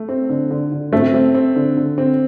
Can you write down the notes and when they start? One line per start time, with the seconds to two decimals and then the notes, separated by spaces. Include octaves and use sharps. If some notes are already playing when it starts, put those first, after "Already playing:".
Already playing: A3
0.09 C4
0.29 D3
0.51 D3
0.72 D3
0.93 A3 C4
1.14 C4
1.35 C4
1.56 D3
1.77 D3
1.98 C4